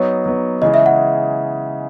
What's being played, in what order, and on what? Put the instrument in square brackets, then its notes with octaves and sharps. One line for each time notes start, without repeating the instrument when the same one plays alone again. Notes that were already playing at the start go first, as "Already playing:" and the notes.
Already playing: [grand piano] F#3 B3 D#4 [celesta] C#5
[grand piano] F#3 B3 D#4
[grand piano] C#3 E3 G#3 [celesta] D#5
[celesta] E5
F#5